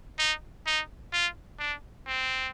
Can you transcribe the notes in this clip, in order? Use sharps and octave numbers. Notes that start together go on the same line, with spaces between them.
D#4
D#4
F4
D4
C4